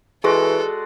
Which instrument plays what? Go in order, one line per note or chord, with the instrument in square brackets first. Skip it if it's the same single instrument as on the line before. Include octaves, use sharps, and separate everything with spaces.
[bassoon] E3 [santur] G#3 F#4 D5 [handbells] G#4 [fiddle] A4